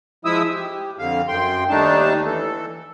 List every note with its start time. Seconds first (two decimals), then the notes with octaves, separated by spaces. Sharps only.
0.25 F3 G#3 E4 E5 D#6 E6
0.54 G4
0.98 F2 D3 F5
1.28 F#2 G5 C6
1.69 D#2 G3 A3 D4 D#4 A5
2.26 E3 A4